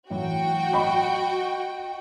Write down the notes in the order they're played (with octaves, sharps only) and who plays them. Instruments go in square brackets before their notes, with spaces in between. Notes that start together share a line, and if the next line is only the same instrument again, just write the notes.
[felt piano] A2 E3 F#3 [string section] F#4 G5
[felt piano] D#5 B5 C#6